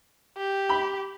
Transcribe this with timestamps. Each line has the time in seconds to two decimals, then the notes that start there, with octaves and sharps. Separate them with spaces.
0.37 G4
0.69 B5